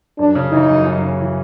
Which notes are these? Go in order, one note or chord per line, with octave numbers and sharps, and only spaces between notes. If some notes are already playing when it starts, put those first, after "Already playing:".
F#2 D4
C#3
E3 D#4
F#2
F#2
C#3
E3